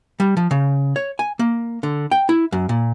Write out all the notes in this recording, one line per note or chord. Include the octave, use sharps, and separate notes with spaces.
G3
F3
C#3
C#5
G#5
A#3
D3
G5
E4
F#2
A#2